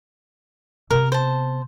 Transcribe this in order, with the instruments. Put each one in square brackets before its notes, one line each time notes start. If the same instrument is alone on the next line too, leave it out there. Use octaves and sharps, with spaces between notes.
[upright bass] C3 B3 [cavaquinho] A#4
[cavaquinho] C5 A5